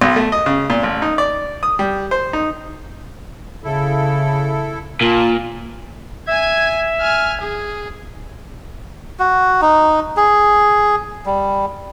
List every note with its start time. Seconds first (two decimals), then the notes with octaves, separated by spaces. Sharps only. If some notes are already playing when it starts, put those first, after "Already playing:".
0.01 B1
0.16 A3
0.32 D#5
0.46 C#3
0.70 A#2
0.83 A1
1.02 D#4
1.18 D5
1.63 D#6
1.79 G3
2.11 C5
2.33 D#4
3.64 C#3 E4 A4
5.01 A#2 F4 A#4 A5
6.29 E5 G#5 G#6
7.01 G#5 F6
7.41 G#4
9.19 F#4
9.62 D#4
10.17 G#4
11.26 G3